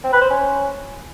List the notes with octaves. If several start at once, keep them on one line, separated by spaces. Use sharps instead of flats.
C4
B4
C5
C#4